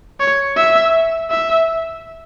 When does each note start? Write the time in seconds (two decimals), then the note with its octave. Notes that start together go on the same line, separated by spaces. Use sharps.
0.20 C#5
0.57 E5
1.31 E5